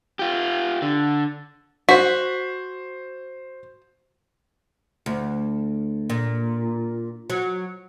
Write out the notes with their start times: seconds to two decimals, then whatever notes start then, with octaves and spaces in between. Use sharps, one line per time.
0.19 F4 G4
0.82 D3
1.89 F#4 C5 B6
5.06 D2
6.10 A#2
7.30 F#3